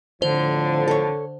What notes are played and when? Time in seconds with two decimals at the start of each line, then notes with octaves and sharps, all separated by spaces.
0.22 F2 A2 D3 F3 C5
0.88 A4 C#5